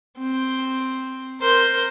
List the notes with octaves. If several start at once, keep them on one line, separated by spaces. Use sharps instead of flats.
C4
A#4 C5